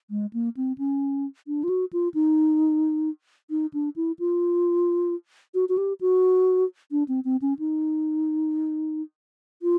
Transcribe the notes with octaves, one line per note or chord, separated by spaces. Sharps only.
G#3
A#3
C4
C#4
D4
F4
F#4
F4
D#4
D#4
D4
E4
F4
F#4
F#4
G4
F#4
D4
C4
C4
C#4
D#4
F4